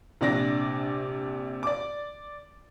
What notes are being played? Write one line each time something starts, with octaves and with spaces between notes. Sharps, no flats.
A#1 C3 D4 D5 D6 A#6
D5 D6